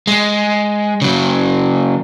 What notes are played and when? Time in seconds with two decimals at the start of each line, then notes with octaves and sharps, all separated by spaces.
0.07 G#3
1.02 C#3 F#3